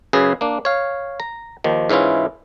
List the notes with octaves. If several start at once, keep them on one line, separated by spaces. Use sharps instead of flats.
F#2 C#3 G#4 B4
A#3 D4
C#5 F5
A#5
D#2 D#3 F3
G#2 E3 C#4 E4 F4